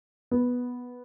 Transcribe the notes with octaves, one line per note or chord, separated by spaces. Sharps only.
B3